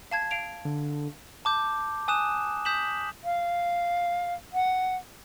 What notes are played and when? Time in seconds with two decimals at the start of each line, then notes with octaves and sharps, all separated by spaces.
0.11 F5 A5 G#6
0.31 F5 D7 F7
0.65 D3
1.45 A5 D6 G6
2.08 G#5 D#6 F#6 E7
2.65 D#6 G6 B6 E7 F#7
3.24 F5
4.53 F#5